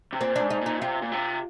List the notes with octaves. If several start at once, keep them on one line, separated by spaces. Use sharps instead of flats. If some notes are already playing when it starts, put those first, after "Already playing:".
C3
A#2 C4
D4
G#2
D#4
A#2 D#4
C3 F4
A#2
C3